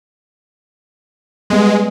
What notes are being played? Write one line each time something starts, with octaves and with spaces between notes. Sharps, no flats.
G3 G#3 B3